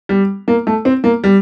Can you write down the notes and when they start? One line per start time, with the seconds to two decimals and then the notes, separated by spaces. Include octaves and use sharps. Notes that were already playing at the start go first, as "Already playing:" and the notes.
0.09 G3
0.48 A#3
0.67 A3
0.85 C4
1.04 A#3
1.24 G3